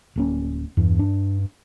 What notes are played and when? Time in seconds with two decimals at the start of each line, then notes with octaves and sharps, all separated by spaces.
0.16 D1 A#3 C#4
0.77 E2 G2
0.99 D4